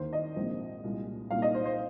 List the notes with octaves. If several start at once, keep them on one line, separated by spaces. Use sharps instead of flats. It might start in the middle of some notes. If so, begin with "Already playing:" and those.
Already playing: D#2 D#3 A#3 D#4 C5
D#5
A#1 G#2 F3 C4
C2 A#2 G#3
C2 A#2 A#3 D#4 F5
D#5
C5
C5